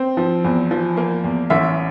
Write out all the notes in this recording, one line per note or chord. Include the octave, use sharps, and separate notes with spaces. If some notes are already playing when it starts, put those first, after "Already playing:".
Already playing: C4
F3
E2
F3
A#3
E2
A1 E5